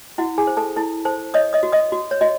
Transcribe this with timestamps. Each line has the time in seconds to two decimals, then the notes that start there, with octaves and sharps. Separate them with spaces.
0.18 E4 F#4 F#5
0.38 G#4 G#5
0.47 C5
0.57 A4 A5
0.76 E4 A4 A5
1.05 A4 C5 A5
1.34 C#5 D#5 D#6
1.53 D#5 D#6
1.63 F#4
1.72 D#5 D#6
1.92 F#4
2.11 C#5
2.21 F#4 D#5